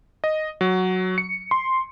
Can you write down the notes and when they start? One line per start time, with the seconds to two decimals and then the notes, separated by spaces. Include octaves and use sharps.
0.24 D#5
0.61 F#3
1.18 C#7
1.51 C6